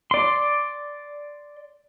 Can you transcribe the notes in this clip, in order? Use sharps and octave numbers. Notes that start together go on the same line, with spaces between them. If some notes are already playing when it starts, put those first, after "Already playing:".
D5 C6